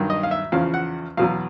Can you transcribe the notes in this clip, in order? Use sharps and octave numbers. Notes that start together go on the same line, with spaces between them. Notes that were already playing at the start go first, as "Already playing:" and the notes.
Already playing: G2 D#3 F#3
D#5
F5
E5
E2 C#3 F3 F5
F#5
E2 B2 F#3 F5